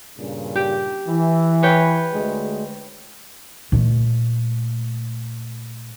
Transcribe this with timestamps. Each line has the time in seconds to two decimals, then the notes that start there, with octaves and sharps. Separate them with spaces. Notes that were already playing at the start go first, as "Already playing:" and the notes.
0.18 G2 A#2 C#3
0.56 G4
1.08 E3
1.63 B4 C#5 G5
2.12 D2 G#3
3.72 A#2 A3